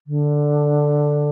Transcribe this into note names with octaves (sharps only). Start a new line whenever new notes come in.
D3